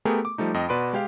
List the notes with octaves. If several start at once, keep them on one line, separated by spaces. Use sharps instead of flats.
A3 B3 G4 G#4 A#4
D6
F3 G3 A3 D#4
F2 D#5 G5
B2 F#4 B4 D5 C6 D7
G#3 G4 F5